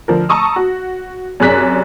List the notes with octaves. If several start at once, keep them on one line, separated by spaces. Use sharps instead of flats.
D3 F3 A#4
A5 A#5 C#6 D#6 E6
F#4
F#2 C3 G#4 D5 F#6 B6